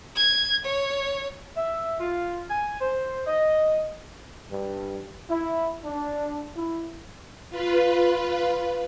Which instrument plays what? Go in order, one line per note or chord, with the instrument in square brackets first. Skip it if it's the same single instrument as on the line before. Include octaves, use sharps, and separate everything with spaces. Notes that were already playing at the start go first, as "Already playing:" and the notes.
[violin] G#6
C#5
[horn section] E5
F4
G#5
C5
D#5
[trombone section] G2
E4
D4
E4
[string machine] F4 B4